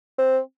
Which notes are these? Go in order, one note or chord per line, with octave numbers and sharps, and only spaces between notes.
C4